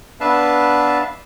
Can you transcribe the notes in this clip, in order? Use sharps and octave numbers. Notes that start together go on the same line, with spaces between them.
B3 D4 B4 E5 F5 A5